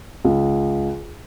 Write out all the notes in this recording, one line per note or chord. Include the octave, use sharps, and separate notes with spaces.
C#2